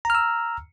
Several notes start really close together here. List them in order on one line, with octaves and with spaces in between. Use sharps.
A#5 F6 E6